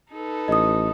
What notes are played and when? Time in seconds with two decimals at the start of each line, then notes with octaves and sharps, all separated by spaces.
0.12 D#4 A4 B4
0.48 A1 D#5 D#6